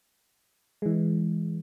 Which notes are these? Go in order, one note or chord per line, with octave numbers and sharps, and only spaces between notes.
E3 G#3